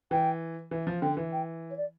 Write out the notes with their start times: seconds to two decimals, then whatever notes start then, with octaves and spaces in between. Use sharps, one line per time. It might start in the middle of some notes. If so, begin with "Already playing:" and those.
0.11 E3 G5
0.71 E3
0.87 F3
1.02 D3 G5
1.17 E3
1.32 G5
1.70 C#5
1.77 D5